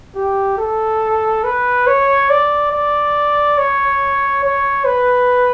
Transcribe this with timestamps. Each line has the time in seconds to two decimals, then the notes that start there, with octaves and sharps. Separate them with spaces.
0.16 G4
0.58 A4
1.44 B4
1.87 C#5
2.30 D5
2.72 D5
3.58 C#5
4.44 C#5
4.86 B4